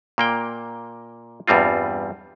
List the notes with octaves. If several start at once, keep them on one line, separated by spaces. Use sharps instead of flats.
A#2 A#3 G5
E2 G2 G3 C4 F4